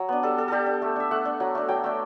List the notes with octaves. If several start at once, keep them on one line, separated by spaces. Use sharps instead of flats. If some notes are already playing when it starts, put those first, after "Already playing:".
Already playing: F#3
B3 D4
G3 A4
D4 A4
G3 G4 A4
D4
A3
D4 E5
A3 F#5
D4
F#3
A3 D4
F#3 G5
A3 D4